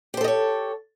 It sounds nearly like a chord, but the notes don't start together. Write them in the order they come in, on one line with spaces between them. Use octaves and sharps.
G4 C5 A4 D#5 C#5